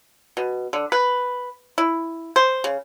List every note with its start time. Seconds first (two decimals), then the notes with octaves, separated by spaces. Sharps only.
0.37 B2
0.73 D3
0.92 B4
1.78 E4
2.36 C5
2.64 C#3